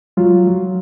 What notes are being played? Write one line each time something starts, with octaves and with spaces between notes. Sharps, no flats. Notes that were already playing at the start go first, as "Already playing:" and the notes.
F#3 F4
F#3